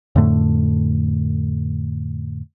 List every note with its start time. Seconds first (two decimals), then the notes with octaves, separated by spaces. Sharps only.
0.15 F2 A2 D3 A3